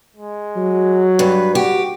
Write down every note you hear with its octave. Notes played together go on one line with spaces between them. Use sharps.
G#3
F#3
G2 B4
F#4 G4